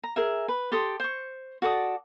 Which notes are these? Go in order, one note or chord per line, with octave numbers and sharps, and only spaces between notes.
A#5
G#4 A#4 E5
B4
G4 A4 C6 D#6
C5 C#6
F#4 A4 D5 D#6